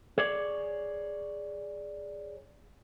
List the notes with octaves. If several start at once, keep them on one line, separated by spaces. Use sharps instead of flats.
G#4 C#5 D5